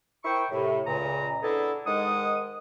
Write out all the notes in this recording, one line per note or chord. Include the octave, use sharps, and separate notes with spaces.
E4 A#4 C5 G5 C#6
A2 C3
C#2 A#2 C#3 A#5
B3 D4 E4 G#4 A4
G#2 D#3 G#3 F#5 D#6